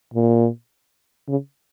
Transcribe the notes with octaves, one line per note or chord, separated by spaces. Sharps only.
A#2
C#3